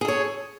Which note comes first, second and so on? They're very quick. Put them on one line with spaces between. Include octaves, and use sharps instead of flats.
G#4 A4 C#5